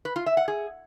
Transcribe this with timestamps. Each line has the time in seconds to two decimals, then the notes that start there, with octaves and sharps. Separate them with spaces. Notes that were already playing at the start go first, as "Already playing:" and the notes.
0.05 B4
0.16 F4
0.26 E5
0.37 F#5
0.48 G#4